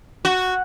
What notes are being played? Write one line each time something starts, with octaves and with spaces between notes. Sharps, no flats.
F#4